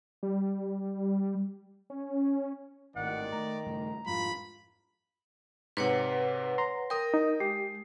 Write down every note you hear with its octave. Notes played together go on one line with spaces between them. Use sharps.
G3
C#4
G#1 A2 D#3 D5 F#5
A3 A#5
G2 C#3 A3
F2 G#2 F4 B5
G#2 C3 B4 C#5 F#5
A#5 C6
A#4 G5 D#6
D#4
G#3 G4